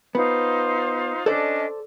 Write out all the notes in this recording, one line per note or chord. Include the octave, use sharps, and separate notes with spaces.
B3 D#4 F4 C5
C#4 D4 A4 C5 D5 D#5